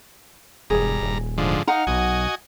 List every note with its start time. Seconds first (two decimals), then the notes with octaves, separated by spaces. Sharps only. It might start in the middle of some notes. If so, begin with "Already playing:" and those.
0.70 E1 G2 G#4 A#5
1.01 D#1
1.38 G#2 D3 F3
1.68 D#4 F5 F#5 A#5
1.87 B1 F#4 D#5 G#5